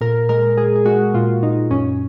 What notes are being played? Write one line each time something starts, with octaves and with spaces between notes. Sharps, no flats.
A#2 A#4
G#3 A#4
G#3 G#4
G#4
G#3 F#4
A#2 F4
A#2 D#4
F#2 C#4